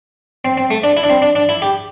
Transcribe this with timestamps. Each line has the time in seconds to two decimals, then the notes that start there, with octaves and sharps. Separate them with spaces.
0.45 C4
0.57 C4
0.71 A3
0.84 D4
0.97 E4
1.03 D4
1.10 C4
1.22 D4
1.35 D4
1.49 E4
1.62 G4